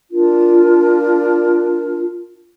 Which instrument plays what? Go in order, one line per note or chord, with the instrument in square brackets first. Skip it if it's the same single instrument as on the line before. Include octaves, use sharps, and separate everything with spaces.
[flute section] D4 F4 A#4